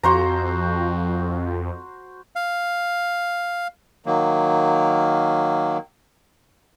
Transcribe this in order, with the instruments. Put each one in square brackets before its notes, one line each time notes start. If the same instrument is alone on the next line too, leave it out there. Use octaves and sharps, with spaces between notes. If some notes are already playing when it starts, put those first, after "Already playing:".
[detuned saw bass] F2 [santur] F#4 C5 A#5
[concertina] F5
[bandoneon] D#3 F#3 A#3